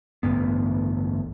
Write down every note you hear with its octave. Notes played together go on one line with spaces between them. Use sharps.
A1 D2 G2 B3